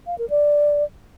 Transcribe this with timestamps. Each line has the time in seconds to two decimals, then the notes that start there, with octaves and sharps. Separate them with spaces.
0.07 F5
0.18 A#4
0.30 D5